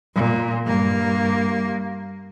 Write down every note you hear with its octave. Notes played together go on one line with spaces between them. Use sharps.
A#2
G2 A#3